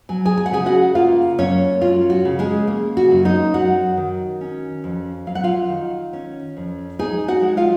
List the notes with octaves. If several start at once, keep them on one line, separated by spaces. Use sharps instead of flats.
F#3 G#5
G#4 G#5
G#5
F#5
C#3 G#4 G#5
F#4 F#5
A#3 F4 F5
F#2 C#4 C#5
F#3 F4
F#4
C#3
G#3 G#4
A#3
F#4
F#2
D#4 D#5
F#3 F#4 F#5
D#3
C#4
F2
F#3 F5
F#5
F4 F5
D#3
C#4
F2
D#4 G#4 G#5
F#4 F#5
G#3
F4 F5